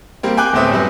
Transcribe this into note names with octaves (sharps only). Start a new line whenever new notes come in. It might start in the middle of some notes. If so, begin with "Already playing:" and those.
G3 A#3 C4
G5 G#5 D6 F#6
D1 A2 B3 C4 E5 D#6
F#2 F#3 G3 B4